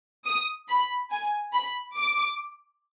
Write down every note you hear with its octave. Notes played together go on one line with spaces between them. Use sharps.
D#6
B5
G#5
B5
D6